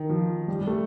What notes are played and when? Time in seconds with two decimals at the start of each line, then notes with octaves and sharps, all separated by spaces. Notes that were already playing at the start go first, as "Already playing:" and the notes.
Already playing: D#3
0.10 F3
0.48 G3
0.61 G3
0.67 A3